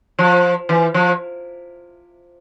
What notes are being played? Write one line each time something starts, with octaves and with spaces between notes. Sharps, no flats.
F3
E3
F3